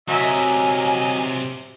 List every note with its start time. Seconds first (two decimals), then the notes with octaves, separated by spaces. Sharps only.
0.08 C3 F#3 A#4 D#5 E5 G#5
0.53 D#5